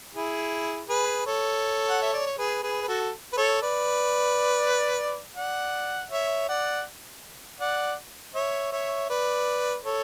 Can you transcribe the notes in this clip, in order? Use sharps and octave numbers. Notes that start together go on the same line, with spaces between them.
E4 G#4
G#4 B4
A4 C#5
F#5
E5
D5
C#5
G#4 B4
G#4 B4
B4
F#4 A4
B4
A4 C#5
B4 D5
D5 F#5
C#5 E5
D5 F#5
D5 F#5
C#5 E5
C#5 E5
B4 D5
A4 C#5